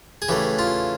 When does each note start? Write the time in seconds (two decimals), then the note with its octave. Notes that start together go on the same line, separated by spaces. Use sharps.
0.22 G#4
0.28 C#3 E3 A3 G4
0.59 F4